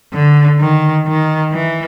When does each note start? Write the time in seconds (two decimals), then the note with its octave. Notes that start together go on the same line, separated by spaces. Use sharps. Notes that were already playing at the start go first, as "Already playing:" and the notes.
0.13 D3
0.59 D#3
1.07 D#3
1.52 E3